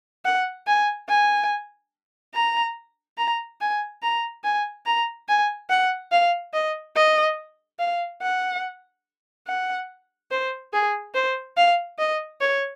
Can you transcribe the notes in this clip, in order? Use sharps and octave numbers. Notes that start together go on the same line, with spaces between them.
F#5
G#5
G#5
A#5
A#5
G#5
A#5
G#5
A#5
G#5
F#5
F5
D#5
D#5
F5
F#5
F#5
C5
G#4
C5
F5
D#5
C#5